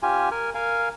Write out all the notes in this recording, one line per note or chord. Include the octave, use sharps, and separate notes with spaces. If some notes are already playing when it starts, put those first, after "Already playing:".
C#4 F4 G4 G#5
A#4 G#5
A#4 F5 G#5